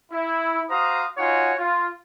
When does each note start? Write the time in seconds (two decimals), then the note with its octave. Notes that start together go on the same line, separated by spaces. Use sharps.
0.12 E4
0.70 F#4 C5 F5 A#5 D#6
1.18 D#4 F4 F#4 C#5 F#5 G#5
1.59 F4